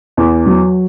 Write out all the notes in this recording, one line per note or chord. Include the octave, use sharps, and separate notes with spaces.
E2
F#3